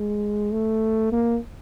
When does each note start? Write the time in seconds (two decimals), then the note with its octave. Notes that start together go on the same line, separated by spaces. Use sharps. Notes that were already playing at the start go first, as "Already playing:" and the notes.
Already playing: G#3
0.52 A3
1.12 A#3